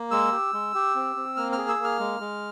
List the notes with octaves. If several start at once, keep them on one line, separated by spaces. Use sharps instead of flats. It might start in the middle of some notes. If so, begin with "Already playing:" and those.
Already playing: A#3
G#3 E6
G4
G#3
G4
C4
C4
A#3 F6
F6
G#4
E6
A#3
F6
G#3
G#3